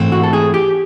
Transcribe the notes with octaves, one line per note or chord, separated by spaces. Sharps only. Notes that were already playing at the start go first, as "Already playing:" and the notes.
Already playing: G#2 E3 A3 C4
F#4
A4
G#4
G4